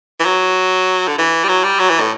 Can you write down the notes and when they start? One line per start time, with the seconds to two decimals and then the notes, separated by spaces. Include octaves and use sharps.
0.19 E3
0.25 F#3
1.08 D3
1.18 E3
1.44 G3
1.49 F#3
1.64 G3
1.79 F#3
1.90 E3
2.00 A2